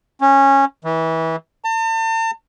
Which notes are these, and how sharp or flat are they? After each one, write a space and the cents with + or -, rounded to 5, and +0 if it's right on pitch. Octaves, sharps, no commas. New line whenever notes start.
C#4 -15
E3 -25
A5 +40